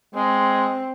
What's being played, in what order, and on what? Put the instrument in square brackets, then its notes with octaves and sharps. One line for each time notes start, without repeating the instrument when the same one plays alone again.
[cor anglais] G#3 [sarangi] C4